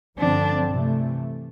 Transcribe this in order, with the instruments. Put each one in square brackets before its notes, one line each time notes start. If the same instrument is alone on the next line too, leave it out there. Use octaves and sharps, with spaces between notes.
[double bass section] G2 D3 F3 C4 [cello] D4
[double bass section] C3 E3 A3